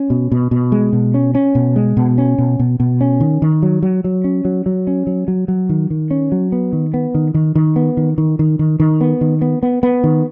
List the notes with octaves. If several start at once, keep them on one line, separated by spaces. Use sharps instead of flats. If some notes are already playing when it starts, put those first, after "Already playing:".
Already playing: C#4
B2
B2
B2
G#3
B2
C#4
C#4
B2
G#3
B2
C#4
B2
B2
B2
C#4
D#3
D#3
F#3
F#3
F#3
C#4
F#3
F#3
C#4
F#3
F#3
F#3
D#3
D#3
C#4
F#3
B3
D#3
B3
D#3
D#3
D#3
B3
D#3
D#3
D#3
D#3
D#3
B3
D#3
B3
B3
B3
D#3